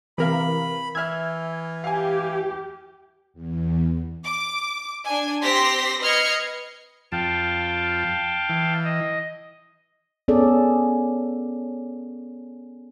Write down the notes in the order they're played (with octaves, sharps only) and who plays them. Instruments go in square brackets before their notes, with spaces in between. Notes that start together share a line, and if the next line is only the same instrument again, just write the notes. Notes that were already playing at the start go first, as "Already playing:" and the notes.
[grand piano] C3 [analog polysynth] E3 A#4 F5 [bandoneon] B5
[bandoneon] E3 [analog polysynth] E5 G#6 [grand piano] E6 F6
[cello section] G4 [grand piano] F5 G#5
[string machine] E2
[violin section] D6
D4 G#5
C4 G4 C6 A#6 B6
B4 D#5 F6 G#6 C7 C#7
[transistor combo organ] F2 [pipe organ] F5 G5 A5
[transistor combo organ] E3
[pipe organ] D#5
[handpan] B3 C#4 G#4 A4 D5